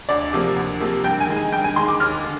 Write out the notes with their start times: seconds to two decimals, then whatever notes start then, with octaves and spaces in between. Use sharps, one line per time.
0.09 D2 D5
0.33 C3 F3 A#3
0.56 D2
0.80 C3 F3 A#3
1.04 G2 G5
1.20 G#5
1.28 D#3 G#3
1.37 G#5
1.52 G2 G5
1.64 G#5
1.76 D#3 G#3 C6
1.88 D6
2.00 D#2 F6
2.24 D3